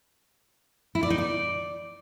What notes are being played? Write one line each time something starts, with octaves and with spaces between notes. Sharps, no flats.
E4
D5
D#4
D5